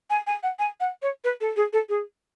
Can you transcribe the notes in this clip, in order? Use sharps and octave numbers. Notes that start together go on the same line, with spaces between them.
G#5
G#5
F#5
G#5
F#5
C#5
B4
A4
G#4
A4
G#4